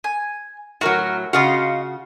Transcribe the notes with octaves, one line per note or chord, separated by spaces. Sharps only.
G#5
A2 F#3 F#4 A#4
C#3 F4 F#4 D#5 F5